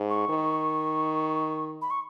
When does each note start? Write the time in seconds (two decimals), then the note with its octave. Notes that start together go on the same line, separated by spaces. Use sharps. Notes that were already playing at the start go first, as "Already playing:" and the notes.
Already playing: G#2
0.10 C#6
0.29 D#3
1.82 B5
1.90 C#6